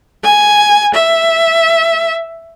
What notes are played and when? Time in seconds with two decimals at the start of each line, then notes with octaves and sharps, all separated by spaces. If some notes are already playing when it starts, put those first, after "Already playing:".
0.24 G#5
0.94 E5